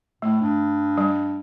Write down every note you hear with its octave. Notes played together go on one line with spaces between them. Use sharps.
A2 A3
G2
G3